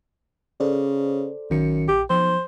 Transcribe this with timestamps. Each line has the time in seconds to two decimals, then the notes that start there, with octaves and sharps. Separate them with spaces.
0.60 C#3 A4 C5 D5
1.50 A#1 F#2 D#3 C#7
1.88 A#1 G4
2.10 B1 F3 C5